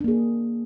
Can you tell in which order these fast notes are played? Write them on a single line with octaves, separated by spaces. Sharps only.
D4 A#3 G#4